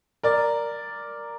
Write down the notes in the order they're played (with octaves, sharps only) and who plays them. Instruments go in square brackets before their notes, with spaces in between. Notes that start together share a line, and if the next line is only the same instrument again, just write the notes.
[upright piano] A#4 D5